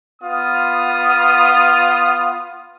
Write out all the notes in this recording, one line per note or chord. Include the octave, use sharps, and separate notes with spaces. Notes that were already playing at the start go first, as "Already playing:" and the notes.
B3 F4 D#6